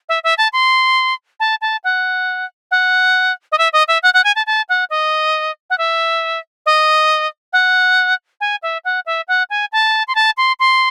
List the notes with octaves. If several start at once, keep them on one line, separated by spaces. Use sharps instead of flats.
E5
E5
A5
C6
A5
A5
F#5
F#5
D#5
E5
D#5
E5
F#5
F#5
G#5
A5
A5
F#5
D#5
F#5
E5
D#5
F#5
G#5
E5
F#5
E5
F#5
G#5
A5
C6
A5
C6
C6